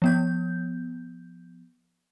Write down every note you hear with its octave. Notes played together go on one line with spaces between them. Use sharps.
F3 B3 G6